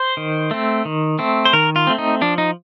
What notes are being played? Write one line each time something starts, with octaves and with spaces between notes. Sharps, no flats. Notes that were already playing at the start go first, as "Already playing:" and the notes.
Already playing: C5
D#3
A3 C4
D#3
A3 C4
C5
D#3 A#4
F4
A3 C4
D#4
F3 D4
D#4